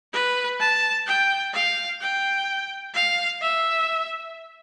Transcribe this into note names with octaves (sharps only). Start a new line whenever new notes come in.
B4
A5
G5
F5
G5
F5
E5